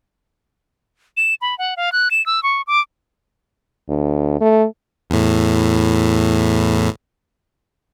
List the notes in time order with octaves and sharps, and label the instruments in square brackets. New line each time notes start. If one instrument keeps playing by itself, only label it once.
[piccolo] E7
B5
F#5
F5
F#6
E7
E6
C#6
D6
[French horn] D2
A3
[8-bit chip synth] E2 A2